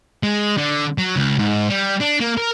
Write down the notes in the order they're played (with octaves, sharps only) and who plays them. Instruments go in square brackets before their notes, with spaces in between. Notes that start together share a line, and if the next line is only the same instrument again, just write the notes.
[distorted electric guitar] G#3
D3
F#3
C#2
G#2
G3
D4
A#3
A#4